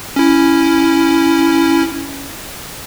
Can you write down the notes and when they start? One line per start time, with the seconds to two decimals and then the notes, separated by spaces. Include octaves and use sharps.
0.16 C#4 E4